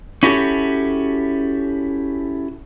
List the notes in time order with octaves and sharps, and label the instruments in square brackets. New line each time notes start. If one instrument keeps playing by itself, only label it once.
[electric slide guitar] C#4 E4 F#4 G4 A4